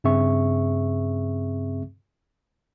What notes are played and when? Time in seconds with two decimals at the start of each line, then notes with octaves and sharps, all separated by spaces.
0.04 G2 C#3 C4 G#4 E5 C#6